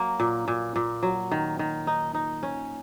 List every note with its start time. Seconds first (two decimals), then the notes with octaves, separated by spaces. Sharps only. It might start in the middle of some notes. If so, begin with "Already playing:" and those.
Already playing: F#3 A#3
0.20 A#2
0.48 A#2
0.76 A#2
1.03 F#3
1.31 D#3
1.59 D#3
1.87 D#4
2.14 D#4
2.43 C#4